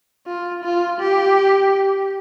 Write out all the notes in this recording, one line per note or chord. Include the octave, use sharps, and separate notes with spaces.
F4
F4
G4